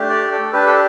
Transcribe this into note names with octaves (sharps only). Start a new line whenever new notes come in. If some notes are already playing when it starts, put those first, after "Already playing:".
Already playing: A3 D4 G4
D5
A4
D4 G4 B4
A4